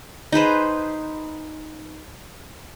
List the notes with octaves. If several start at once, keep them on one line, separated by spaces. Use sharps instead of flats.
D#4 G#4 B4 C5